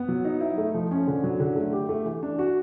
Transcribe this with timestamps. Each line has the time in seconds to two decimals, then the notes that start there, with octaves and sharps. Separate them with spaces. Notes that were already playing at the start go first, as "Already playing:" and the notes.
Already playing: B3
0.08 F#3
0.25 D#4
0.41 E4
0.58 A3
0.74 F3
0.91 C#4
1.07 D3
1.24 F#3
1.40 D3
1.56 A3
1.73 G4
1.89 A3
2.05 E3
2.23 D4
2.39 F#4